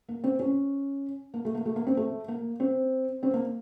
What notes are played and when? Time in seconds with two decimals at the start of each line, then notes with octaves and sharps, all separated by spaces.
0.08 A#3
0.24 C4
0.39 C#4
1.34 A#3
1.45 A3
1.55 A#3
1.65 A3
1.76 A#3
1.87 C4
1.97 A3
2.28 A#3
2.60 C4
3.23 C4
3.34 A#3